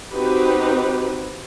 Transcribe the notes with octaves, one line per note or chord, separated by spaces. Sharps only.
C4 D#4 F#4 G4 B4